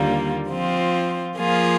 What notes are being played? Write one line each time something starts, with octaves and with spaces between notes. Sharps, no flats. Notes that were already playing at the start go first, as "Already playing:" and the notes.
Already playing: D#2 D3 G3 A#3 F4
F3 C4 F4
F3 A#3 F4 G#4